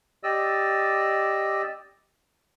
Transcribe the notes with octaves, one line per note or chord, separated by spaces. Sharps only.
G4 D5 D#5 E6